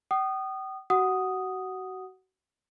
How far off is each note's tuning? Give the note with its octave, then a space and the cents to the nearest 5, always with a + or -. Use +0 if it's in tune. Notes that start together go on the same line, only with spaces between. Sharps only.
G5 -40 D#6 -20
F#4 +25 F#5 +0 D#6 +0